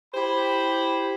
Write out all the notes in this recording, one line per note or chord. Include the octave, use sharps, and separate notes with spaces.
E4 G4 C5 B5